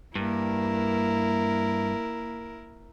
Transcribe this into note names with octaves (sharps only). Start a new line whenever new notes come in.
G2 A#3 E4 A#4